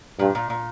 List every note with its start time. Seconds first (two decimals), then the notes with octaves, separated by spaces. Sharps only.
0.19 G2 A#2
0.35 A#2
0.50 A#2